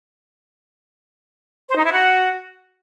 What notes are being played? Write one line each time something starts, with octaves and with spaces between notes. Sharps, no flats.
C5
D#4
E4
F#4